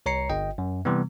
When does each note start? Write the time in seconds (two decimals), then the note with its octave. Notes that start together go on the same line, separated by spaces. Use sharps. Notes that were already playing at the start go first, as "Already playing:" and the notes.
0.06 C2 C#5 A#5 C7 C#7
0.30 G1 D#5 G5
0.58 F#2
0.85 C3 E3 G3 B3